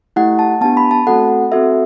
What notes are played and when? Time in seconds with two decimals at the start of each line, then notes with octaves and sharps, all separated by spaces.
0.16 A3 E4 G4 F#5
0.39 A5
0.61 B3 D4 G4 A5
0.77 B5
0.91 A5
1.07 A3 C4 F#4 A4 F#5
1.52 C4 F#4 A4 E5